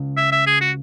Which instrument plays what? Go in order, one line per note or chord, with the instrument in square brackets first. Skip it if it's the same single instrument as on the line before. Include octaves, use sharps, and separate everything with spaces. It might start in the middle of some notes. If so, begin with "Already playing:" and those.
Already playing: [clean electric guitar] C#2 C#3
[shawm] E5
E5
G#4
F#4